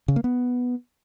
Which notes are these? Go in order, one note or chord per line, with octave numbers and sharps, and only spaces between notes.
C#3
A#3
B3